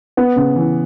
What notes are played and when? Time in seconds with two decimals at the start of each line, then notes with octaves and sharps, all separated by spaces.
0.17 B3
0.36 C#3
0.55 E3